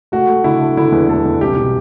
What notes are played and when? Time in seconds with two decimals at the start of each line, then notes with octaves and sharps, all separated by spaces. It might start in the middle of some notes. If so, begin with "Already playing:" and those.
0.12 A3 F#4
0.29 A3
0.44 D3 E4
0.61 D3
0.77 D3 E4
0.92 E2
1.08 E2 A4
1.25 E2
1.41 C2 G4
1.56 B2